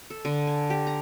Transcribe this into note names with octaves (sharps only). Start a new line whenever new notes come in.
A4
D3
G#5
G4
A#5